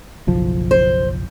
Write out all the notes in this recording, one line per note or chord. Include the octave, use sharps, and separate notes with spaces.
F#1 B1 F3
C5